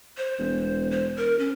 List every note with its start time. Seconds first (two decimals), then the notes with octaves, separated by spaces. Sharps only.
0.17 C5
0.39 E1
0.91 C5
1.17 A#4
1.39 C#4